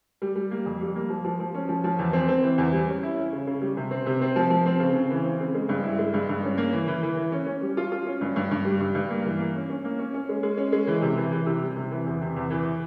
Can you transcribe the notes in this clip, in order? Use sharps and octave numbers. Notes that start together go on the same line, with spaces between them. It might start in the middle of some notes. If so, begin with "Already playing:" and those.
G3
G3
A#3
F2
G3
A#3
F3
F3
F3
C#4
F3
F3
E2
C4
C4
E3
E2
G3
C#4
E4
C#4
C#3
C#3
G3
C3
C4
C3
C4
F3
F3
C4
C#3
C#3
E3
C4
C#3
G#3
G2
E4
G#3
G2
G2
C#4
A#3
E3
E3
E3
E3
C#4
C#4
G3
F4
F4
C#4
G2
G2
G2
G3
G2
G2
A#3
E3
A#3
C#4
C#4
A#3
C#4
C#4
G#3
G#3
C#4
G#3
E3
C3
E3
E3
C3
G3
C3
E3
E2
C3
E2
E3